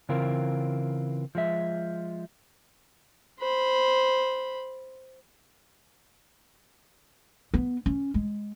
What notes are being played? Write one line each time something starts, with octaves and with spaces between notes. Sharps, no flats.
C#3 E3 C4 F4 A#4
F3 G#3 E5
C5 B5
B3
C#4
G#3